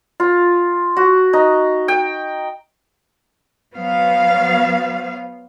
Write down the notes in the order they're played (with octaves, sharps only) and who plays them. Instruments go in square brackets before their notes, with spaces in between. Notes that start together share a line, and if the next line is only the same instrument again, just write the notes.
[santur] F4
F#4
D#4
G5
[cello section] F#3 B3 C5 F5